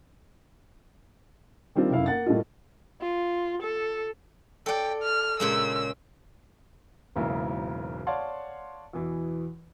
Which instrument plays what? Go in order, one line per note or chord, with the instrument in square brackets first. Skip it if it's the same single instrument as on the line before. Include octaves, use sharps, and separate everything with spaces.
[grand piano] D#3 G3 C4 D4 F4
F1 F#2 E4 F5
A#3 F#5 A6
A2 G3 A#3 D#4 F4
[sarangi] F4
A4
[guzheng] A4 D5 [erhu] G5
[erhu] F6
[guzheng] A#2 C#3 G#3 [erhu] E6
[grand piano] E1 B1 G#2 C#3 A#3 E4
C#5 D5 F5 F#5 A5 C6
E2 B2 E3